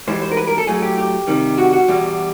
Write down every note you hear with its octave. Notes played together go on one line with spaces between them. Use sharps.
G#2 E3 G3 C5
C5
A#4
B4
A#4
A4
A2 F#3 A3 G#4
G4
G4
C3 D#3 G3
F#4
F#4
E2 B2 G3